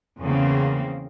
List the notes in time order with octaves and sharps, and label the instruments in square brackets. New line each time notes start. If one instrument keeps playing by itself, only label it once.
[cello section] E2 C#3 A#3 C4